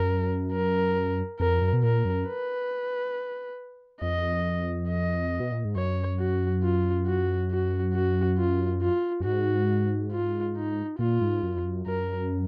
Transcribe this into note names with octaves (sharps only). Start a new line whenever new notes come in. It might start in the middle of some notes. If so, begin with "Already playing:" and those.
Already playing: F#2 A#4
A#4
F2 A#4
F#2
B2
A#2 A#4
F#2
B4
F2 D#5
D#5
B2
A#2
G#2
F#2 C#5
F#4
F4
F#4
F#4
F#4
F4
F4
F#2
G#2 F#4
F4
D#4
A#2 F4
G#2
F#2
F2
F#2
F#2 A#4